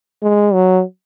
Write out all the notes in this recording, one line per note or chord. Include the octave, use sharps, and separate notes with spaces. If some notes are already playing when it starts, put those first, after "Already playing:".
G#3
F#3